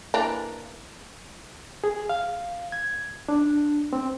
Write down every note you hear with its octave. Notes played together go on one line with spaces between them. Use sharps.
E3 A#3 D4
G#4
F5
G#6
D4
C4